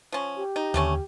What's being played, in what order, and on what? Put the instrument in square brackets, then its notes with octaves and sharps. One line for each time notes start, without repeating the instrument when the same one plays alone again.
[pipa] F3 C#4
[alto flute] G4
[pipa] D#4
[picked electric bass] D#2 D3 [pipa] G3 A3 C#4